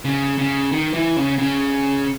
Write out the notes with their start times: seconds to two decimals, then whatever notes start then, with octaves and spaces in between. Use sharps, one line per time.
0.05 C#3
0.38 C#3
0.72 D#3
0.94 E3
1.16 C#3
1.38 C#3